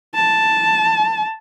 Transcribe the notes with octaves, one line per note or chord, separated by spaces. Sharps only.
A5